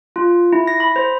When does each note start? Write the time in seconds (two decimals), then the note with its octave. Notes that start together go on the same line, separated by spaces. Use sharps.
0.16 F4
0.53 E4
0.67 A#6
0.80 B5
0.96 C5